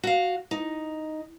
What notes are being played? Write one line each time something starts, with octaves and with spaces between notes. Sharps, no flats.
F#4 F5
D#4